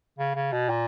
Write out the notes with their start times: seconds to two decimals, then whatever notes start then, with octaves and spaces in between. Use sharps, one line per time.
0.18 C#3
0.35 C#3
0.53 B2
0.69 A#2